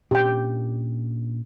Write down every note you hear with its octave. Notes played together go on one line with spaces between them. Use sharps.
A#2 C#4 D4 G4 G5